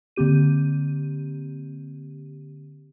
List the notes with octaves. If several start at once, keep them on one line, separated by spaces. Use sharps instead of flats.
D3 A#3 C4 G4 D#7